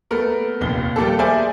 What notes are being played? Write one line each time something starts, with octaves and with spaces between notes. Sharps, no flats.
A3 B3 A#4 B4
F1 A#1 D#2 G7
G3 A3 A#3 A4
G#4 A#4 C5 D5 E5 G#5